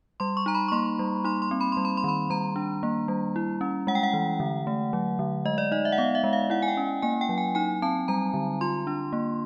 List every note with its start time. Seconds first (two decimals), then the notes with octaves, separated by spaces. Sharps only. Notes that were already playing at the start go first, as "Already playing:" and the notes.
0.20 G3 C6
0.37 C#6
0.46 D#4 A#5
0.55 B5
0.68 C#6
0.72 A#3 C6
0.99 G3
1.24 D#4 C6
1.42 C6
1.51 C4
1.61 B5
1.72 G3 C6
1.85 B5
1.97 C6
2.04 D#3 B5
2.30 G3 A#5
2.56 D4
2.83 A#3
3.08 G3
3.36 E4
3.61 C#4
3.87 G#3 F#5
3.95 G5
4.03 F#5
4.14 E3
4.40 D3
4.67 A3
4.93 F#3
5.19 D3
5.45 G#3 D#5
5.58 D5
5.72 D#4 D#5
5.85 E5
5.92 F#5
5.98 B3 F5
6.15 E5
6.24 G#3
6.33 F5
6.50 E4 F#5
6.62 G#5
6.68 G5
6.77 C#4
7.02 A#3 G#5
7.21 G5
7.29 F#3
7.38 G#5
7.55 D#4 G#5
7.82 C4 A5
8.08 G3 A#5
8.34 D3
8.61 F4 C6
8.87 D4
9.13 A#3